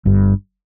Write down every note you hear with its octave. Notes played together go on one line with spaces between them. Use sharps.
G1 G2